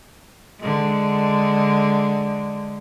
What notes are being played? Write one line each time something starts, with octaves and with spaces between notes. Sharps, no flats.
D3 G#3